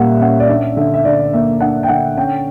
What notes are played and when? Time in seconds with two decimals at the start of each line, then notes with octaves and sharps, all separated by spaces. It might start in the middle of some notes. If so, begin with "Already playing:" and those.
Already playing: A#2 G3 A#3 C#4 E5 F#5
0.21 C#4 F#5
0.40 D5
0.49 D4 E5
0.77 D3 E5
0.94 E5
1.05 D3 D5
1.34 A#3 E5
1.61 D4 F#5
1.83 G5
1.88 D3 F#5
2.17 C#4 G5